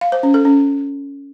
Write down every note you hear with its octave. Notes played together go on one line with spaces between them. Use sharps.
F5
C5
C#4
A4
C#4